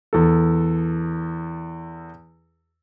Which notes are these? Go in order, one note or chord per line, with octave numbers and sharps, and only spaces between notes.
E2 A4